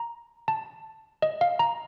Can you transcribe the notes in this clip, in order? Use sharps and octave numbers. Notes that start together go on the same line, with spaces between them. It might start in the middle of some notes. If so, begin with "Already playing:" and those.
Already playing: A#5
A5
D#5
F5
A#5